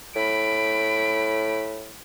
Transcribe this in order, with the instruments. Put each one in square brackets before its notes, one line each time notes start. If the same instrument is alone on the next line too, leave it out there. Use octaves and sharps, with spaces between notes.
[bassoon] A2 [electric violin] B5 D7